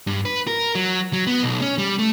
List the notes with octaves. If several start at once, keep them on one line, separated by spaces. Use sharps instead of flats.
G2
B4
A#4
F#3
F#3
B3
B1
C#4
G3
A3